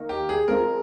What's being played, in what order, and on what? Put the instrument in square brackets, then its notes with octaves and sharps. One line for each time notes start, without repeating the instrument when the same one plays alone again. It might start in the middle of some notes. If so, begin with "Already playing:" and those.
Already playing: [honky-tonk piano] D#3 A#3 D#4 A#4
[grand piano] G4
G#4
[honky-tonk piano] F3 G#3 C4 F4 [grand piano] A#4